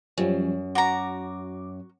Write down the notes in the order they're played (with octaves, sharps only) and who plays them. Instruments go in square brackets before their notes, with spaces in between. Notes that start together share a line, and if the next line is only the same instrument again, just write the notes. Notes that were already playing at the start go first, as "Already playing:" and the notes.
[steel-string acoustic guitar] F#2 [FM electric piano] F3 G3 C#4
[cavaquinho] F#4 A#5 [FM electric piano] D6